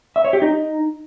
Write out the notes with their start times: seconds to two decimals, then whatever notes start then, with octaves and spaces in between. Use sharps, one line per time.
0.16 E5
0.25 C#5
0.33 G4
0.42 D#4